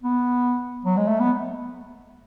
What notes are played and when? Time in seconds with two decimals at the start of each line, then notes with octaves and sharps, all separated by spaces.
0.03 B3
0.85 F#3
0.97 G#3
1.08 A3
1.20 B3